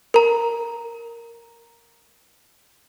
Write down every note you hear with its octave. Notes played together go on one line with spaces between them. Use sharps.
A#4 A#5